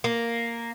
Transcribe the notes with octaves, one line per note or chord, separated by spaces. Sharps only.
A#3